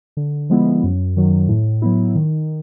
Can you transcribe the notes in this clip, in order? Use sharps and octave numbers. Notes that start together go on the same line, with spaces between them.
D3
F3 G#3 B3 E4
F#2
D#3 F#3
A2
F#3 B3 E4
D#3